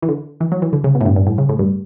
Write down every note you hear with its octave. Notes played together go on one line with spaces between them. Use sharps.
E3
D3
E3
F#3
E3
D3
C#3
B2
A2
G2
G2
A2
C#3
A2
G2